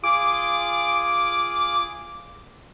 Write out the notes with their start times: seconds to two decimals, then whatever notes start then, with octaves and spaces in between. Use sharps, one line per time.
0.04 F4 G#4 D6